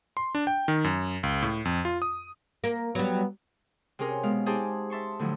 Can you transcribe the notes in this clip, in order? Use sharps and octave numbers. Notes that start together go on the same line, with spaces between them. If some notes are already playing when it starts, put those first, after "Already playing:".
C6
D4
G5
D#3
F#2
C#2
A2
F2
F4
D#6
A#3
F#3 G3 B3
C3 C4 C#4 G#4 A#4 C6
B2 G#3 F5
D#4 G4 G#4 C5 A5 D6
E5 A5 C6 C#6
A2 D3 F3 F#3